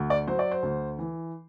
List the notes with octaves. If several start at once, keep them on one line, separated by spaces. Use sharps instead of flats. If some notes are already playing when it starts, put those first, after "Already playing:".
Already playing: D2
D5
F#3 C5
D5
C5
D2
E3